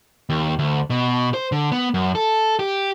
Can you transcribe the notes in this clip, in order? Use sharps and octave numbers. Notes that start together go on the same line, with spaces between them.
D#2
D2
B2
C5
D3
B3
F#2
A4
G4